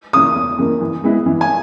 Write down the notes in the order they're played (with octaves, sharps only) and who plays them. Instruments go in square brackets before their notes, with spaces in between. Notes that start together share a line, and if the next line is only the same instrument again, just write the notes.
[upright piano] C#3 E3 A#3 [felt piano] D#6
[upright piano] E2
C#3 E3 A#3
E3
G#3 B3 E4
E3
[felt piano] G#5